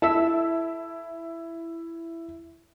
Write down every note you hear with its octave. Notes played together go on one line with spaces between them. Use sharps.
E4 A4 E5